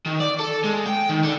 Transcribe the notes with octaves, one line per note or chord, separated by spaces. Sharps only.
D#3
D5
A4
G#3
G5
D#3
D3